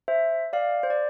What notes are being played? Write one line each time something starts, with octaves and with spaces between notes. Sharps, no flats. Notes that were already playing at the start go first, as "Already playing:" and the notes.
C5 E5
D5 F5
C5
D5